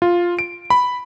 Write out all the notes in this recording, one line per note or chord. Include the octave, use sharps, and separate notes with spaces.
F4
D7
B5